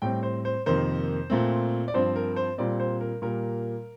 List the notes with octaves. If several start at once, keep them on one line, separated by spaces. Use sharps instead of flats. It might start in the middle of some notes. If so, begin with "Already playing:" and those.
A2 G3 C4 G5
C5
C5
F2 C3 D#3 A#3 C5
A#2 A3 C4
D5
G2 F3 C4 C5
A#4
C5
A#2 G3 C4 D5
C5
A#4
A#2 G3 A#3 A#4